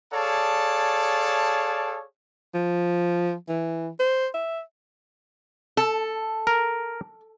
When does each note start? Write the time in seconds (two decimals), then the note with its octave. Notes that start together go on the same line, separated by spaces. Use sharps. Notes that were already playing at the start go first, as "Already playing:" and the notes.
0.13 G#4 A4 C#5 D5 F5 A5
2.54 F3
3.49 E3
4.00 C5
4.34 E5
5.77 A4
6.47 A#4